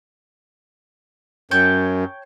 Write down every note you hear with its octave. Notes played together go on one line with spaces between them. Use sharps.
F#2 C#5 G5 A5